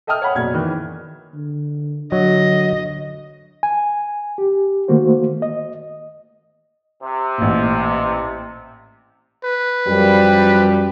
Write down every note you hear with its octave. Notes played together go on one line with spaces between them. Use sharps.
A4 D#5 E5 G5 D#6 F6
C#5 F#5 B5
F#1 B2 D5 G#6
D#3 E3
D3
D3 F#3 D#5
G#5
G4
D#3 A3 A#3 F#4 C5
D#5
C3
A1 A#2
B4
F#2 F3 G3